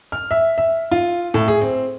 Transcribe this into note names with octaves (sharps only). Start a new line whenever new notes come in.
F6
E5
E5
F4
A2
G#4
C4